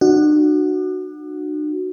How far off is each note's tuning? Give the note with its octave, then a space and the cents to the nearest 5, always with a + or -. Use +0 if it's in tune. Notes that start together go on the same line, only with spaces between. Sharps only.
D4 +45 F#4 +0